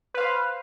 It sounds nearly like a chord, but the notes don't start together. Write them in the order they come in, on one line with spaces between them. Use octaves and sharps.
B4 F5 C5